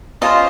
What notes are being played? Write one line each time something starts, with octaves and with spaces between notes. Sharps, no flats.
C#4 F4 A4 C5 D#5